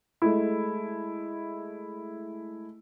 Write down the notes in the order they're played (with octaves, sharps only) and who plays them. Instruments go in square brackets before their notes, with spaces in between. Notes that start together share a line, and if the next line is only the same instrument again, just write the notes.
[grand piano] G#3 A3 E4